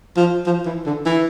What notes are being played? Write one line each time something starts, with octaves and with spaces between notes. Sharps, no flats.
F3
F3
E3
D3
E3